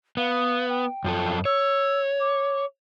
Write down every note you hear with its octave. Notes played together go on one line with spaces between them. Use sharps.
B3 F5
G5
F#2 F3 A4
C#5 E6
D6